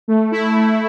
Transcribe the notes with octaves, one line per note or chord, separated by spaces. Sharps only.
A3
E4
A3